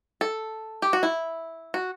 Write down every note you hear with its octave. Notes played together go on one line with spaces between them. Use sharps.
A4
G4
F#4
E4
F#4